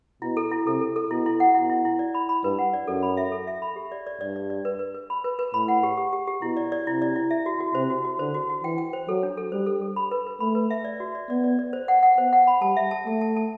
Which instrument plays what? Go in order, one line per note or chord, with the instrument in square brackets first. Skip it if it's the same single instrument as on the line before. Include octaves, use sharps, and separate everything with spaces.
[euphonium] B2 [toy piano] E4
[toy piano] A4
E4
[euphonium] C3 [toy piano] A4
[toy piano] A4
A4
[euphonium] B2 [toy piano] E4
[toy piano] E4
F#5
[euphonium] B2 [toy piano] E4
[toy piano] E4
E4
D5
B5
B5
[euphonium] G2 [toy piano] B4
[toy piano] F#5
D5
[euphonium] F#2 [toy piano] A4
[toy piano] B5
E5
A4
E5
B5
G4
D5
D5
[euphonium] G2 [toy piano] D5
[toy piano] D5
D5
B4
B4
B4
B5
B4
B4
[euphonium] A2 [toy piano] B5
[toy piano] F#5
G4
G4
G4
G4
[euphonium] B2 [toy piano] E4
[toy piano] D5
D5
[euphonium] C3 [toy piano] E4
[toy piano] D5
E4
E5
F#4
F#4
[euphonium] C3 [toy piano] C5
[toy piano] F#4
F#4
[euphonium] D3 [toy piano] C5
[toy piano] F#4
F#4
[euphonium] E3 [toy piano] G5
[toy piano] G5
C5
[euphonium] F#3 [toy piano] A4
[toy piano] D4
A4
[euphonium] G3 [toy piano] C5
[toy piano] A4
A4
B5
B4
B4
[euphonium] A3 [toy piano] B5
[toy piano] B4
E5
D5
F#4
D5
[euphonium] B3 [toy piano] D5
[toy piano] D5
D5
C5
F#5
F#5
[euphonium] B3 [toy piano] C5
[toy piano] F#5
B5
[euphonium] G3 [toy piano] A5
[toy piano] E5
A5
[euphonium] A3 [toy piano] A5
[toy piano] A5
A5